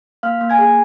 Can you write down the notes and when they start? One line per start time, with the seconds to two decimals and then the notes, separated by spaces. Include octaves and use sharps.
0.23 A#3 F5 F6
0.41 A#3
0.50 G#5 G#6
0.59 G#4